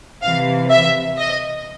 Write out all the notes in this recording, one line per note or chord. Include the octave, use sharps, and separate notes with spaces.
C3 E3 F5
E5
D#5